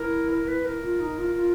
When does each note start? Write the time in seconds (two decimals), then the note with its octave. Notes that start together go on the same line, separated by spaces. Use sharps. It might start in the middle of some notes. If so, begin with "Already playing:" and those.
Already playing: E4 A#4
0.30 A#4
0.47 B4
0.65 A#4
0.83 F4
1.00 D#4
1.17 F4
1.35 F4